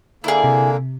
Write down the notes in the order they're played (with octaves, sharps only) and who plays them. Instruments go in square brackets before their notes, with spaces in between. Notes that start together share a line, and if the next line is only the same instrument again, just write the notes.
[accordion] D3 A#3 [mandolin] E4 G#4
[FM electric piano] C3